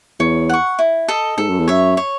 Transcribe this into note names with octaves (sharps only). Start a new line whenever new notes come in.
E2 C#5
F#5 C#6
E4
A4 D#5 A5
G#2 A4
F#2
E2
F#2 C#5 E5
C#5